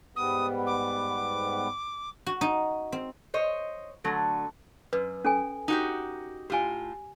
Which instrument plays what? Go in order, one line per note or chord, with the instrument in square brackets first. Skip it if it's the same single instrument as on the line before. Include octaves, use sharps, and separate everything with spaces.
[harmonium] G#2 G3 B3 [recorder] D#6
[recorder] D6
[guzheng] F#4
D#4
C4
[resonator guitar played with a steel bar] C5 C#5 D#5
D3 F#3 A3
[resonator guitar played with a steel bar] F#2 [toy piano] B4
[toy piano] C#4 A4 G#5
[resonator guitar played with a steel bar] D#4 F#4 G4
[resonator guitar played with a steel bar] A2 F4 [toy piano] G4 G#5